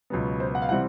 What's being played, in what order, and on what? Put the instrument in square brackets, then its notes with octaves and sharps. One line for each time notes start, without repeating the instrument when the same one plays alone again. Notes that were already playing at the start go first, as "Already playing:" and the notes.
[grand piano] C#2 B2 F#3 B3
C5
F#5
F5
C3 E3 G3 C4 F#5